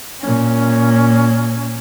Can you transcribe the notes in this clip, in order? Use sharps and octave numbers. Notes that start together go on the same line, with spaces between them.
A#2 C#4